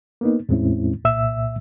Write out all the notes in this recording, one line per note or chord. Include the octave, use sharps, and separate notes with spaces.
A#3 B3 D#4
E2 A2 G#3 C4 C#4 E4
C2 A#2 E5 E6